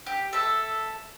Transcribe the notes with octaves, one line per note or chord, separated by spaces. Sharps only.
G4
A4 E5